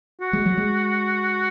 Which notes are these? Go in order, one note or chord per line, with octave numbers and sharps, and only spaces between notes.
F#4
G#3
F#3
G#3